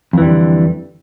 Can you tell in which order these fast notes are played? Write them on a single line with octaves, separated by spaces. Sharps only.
F2 E3 G3 D3